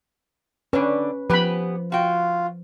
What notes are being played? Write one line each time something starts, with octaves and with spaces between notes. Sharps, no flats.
D3 C#4 D4 B4
F3 B3 G4 B4 G#5 B5
F4 F#4 G5